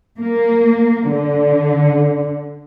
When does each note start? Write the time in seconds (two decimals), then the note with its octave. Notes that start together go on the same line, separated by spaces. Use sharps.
0.18 A#3
1.07 D3